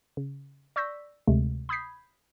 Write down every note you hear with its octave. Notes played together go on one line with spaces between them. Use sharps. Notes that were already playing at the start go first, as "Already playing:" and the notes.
C#3
D5 C#6 E6 G6 A#6 B6
D2 C3 G#3 A3
B5 D#6 G6 G#6 B6 C7